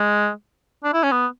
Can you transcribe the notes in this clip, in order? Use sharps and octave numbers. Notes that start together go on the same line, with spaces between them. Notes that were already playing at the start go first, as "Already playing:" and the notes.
Already playing: G#3
D4
E4
C#4
B3